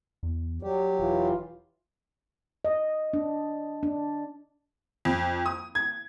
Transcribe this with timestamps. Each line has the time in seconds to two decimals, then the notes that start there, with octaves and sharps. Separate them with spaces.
0.23 E2
0.62 F#3 G3 G4
0.99 E1 E3 F4
2.65 D#5
3.13 D4
3.83 D4
5.05 F2
5.46 D#6
5.75 G#6